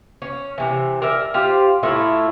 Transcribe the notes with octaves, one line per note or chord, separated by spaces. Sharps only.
C#4
C3 E3
A#4 D5 E5
F4 G4 C5
A2 A3 E4 F4